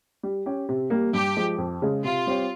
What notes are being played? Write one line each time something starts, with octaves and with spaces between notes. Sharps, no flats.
G3
C#4 G4
C3
G3 A#3
G2 G4
F3 G#3
F2
C#3 G#3
C3 F4
G3 C4 G4 C#5